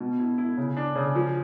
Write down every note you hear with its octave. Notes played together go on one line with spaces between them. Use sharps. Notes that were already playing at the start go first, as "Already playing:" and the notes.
B2
E4
E4
C#3
D4
C#3
F3